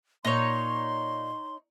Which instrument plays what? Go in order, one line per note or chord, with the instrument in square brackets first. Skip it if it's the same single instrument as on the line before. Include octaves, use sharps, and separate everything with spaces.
[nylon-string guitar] A#2 [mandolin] D#4 C#5 [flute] C6